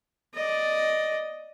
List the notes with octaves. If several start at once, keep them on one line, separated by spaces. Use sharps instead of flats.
D5 D#5